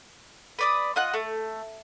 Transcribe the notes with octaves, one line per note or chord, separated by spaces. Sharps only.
B4 D5 D#6
F4 D#5 F#5 F#6
A3